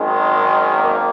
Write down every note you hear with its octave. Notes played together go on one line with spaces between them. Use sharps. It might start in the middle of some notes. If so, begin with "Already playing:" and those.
Already playing: G#1 F#2 D#3 G#3
A#3